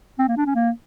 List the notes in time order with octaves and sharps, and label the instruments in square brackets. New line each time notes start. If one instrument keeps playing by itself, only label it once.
[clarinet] C4
A#3
D4
C#4
A#3